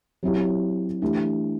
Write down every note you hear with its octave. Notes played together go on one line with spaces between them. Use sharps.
F#3 C4 E4 G4
E3 A3 D4 G4